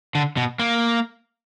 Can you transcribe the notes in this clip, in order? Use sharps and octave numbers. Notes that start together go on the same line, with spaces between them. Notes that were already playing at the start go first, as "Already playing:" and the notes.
D3
B2
A#3